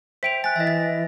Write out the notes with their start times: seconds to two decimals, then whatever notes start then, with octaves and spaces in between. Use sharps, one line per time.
0.23 C5 E5 G5 B6 D7 F7
0.44 G#5 F#6 A6
0.56 E3 D#5 E5
0.67 A6